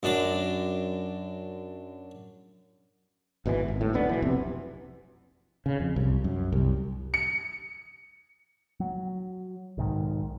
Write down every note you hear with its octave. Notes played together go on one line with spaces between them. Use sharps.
F#2 D4 D6
G#1 B2 D3 E3
G#1
A2
D#1 B1 B3 D4
B2 E3
B1 F2 C3 B3
C#3
F2
C2
F#2
C2
C#7
F#3
B1 G#2 D#3